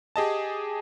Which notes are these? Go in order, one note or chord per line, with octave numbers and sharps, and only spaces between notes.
G4 G#4 D#5 A5